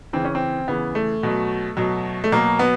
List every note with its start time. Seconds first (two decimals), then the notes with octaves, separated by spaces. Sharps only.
0.13 C#3 E3 C4
0.25 C#4
0.35 C4
0.68 C#3 E3 B3
0.95 A3
1.23 B2 F#3
1.77 B2 F#3
2.24 A3
2.32 B2 F#3 A#3
2.59 B3